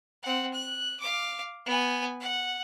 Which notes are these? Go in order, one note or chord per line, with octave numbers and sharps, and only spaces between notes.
C4 F#5
F#6
F5 D6
B3 G#5
F#5